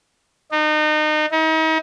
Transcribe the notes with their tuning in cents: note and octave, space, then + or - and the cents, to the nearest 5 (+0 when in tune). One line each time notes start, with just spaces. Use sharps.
D#4 -30
D#4 +40